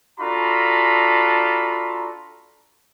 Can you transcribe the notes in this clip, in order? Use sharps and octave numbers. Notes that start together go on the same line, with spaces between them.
D4 F4 F#4 A4 A#5 B5